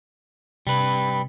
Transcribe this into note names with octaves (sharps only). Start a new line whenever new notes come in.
C3 G3 B4